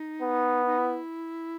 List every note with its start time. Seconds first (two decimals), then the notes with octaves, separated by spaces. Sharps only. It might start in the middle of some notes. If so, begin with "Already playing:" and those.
Already playing: D#4
0.22 B3
0.66 D#4
0.78 E4